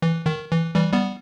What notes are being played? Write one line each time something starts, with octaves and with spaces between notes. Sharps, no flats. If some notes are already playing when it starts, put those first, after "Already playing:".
E3
D#3
E3
E3 G3
G3 B3